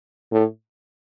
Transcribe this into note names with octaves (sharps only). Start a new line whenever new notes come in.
A2